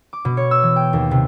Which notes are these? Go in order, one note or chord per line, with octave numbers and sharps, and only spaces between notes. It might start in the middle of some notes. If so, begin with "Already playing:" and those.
D6
B2
C#5
E6
E3
G5
D#2
C3